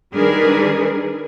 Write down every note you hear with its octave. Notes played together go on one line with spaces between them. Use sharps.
D#3 G3 D4 G#4 A#4 B4